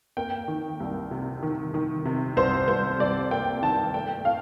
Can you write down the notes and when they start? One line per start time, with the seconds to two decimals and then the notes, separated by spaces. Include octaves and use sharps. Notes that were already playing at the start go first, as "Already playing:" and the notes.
0.17 A#3 G5
0.48 D#3
0.80 C2
1.11 C3
1.43 D#3
1.74 D#3
2.05 C3
2.37 C2 C5
2.68 C2 C5
3.00 C2 D5
3.31 A#3 G5
3.62 D#3 A5
3.94 A3 G5
4.25 A2 F5